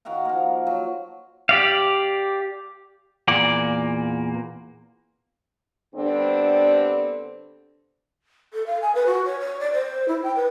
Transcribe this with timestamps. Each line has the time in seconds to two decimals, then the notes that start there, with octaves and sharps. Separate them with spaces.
0.05 D#3 F#4 F5 F#5
0.25 F3 A#3
0.67 F#3
1.49 G4 D5 F5
3.28 E2 A#2 A#3 D5
5.95 D3 G3 B3 C4 D4
8.53 A4
8.66 F5
8.82 G#5
8.94 B4
9.06 F#4
9.25 C#5
9.40 C#5
9.59 D5
9.73 C5
10.08 E4
10.23 G5
10.36 B4